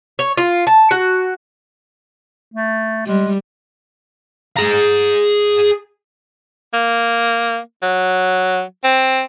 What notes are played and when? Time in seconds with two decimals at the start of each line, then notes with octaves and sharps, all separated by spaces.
0.19 C#5
0.37 F4
0.67 A5
0.91 F#4
2.54 A3
3.07 G3 G#3
4.57 G#4 A#5
6.74 A#3
7.83 F#3
8.84 C4